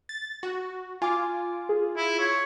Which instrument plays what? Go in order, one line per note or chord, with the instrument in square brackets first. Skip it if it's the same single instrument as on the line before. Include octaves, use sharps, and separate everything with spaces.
[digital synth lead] A6
F#4
[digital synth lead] F4 [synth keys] G#5 D6
[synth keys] G#4
[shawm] E4
C#5